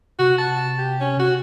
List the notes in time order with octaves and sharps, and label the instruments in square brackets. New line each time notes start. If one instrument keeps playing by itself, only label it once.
[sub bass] C3 [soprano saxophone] F#4
[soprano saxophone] A5
G4
C#4
F#4